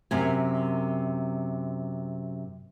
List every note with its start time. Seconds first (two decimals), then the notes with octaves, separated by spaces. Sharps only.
0.11 F#2 C3 G#5